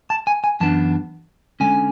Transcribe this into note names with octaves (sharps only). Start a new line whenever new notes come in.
A5
G#5
G#5
F#2 E3 B3 D4 A5
D3 G#3 C#4 G#5